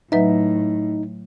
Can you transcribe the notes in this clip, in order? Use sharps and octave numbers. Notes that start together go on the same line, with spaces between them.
A2 F#3 D#4 B4 E5